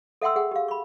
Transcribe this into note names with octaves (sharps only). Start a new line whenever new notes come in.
A4 E5 F#5 G5 C6 E6
G#4 F#5 G5
G4 F5
B5 C#6